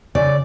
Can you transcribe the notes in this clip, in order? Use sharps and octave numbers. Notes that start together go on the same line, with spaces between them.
C#3 D5